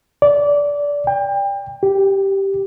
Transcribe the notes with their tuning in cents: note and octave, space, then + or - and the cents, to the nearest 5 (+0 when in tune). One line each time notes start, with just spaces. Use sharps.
D5 -20
G5 +30
G4 -5